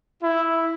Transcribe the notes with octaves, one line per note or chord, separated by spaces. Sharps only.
E4